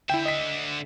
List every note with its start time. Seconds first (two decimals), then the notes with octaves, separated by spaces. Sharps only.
0.10 D3 E4 E5 G5
0.26 D#5 B6